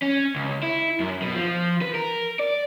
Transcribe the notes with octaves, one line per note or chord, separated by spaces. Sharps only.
C#4
C#2
E4
F#2
B2
F3
B4
A#4
D5